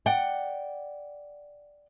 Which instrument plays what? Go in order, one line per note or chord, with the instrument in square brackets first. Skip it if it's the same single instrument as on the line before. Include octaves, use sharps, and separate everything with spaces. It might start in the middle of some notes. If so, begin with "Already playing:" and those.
[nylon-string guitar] D5 F#5 G5